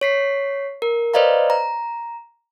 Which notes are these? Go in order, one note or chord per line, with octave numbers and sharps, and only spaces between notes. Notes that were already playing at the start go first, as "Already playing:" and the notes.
C#5 B6 C7
A#4
B4 C5 D5 D#5 F5 A#5
A#5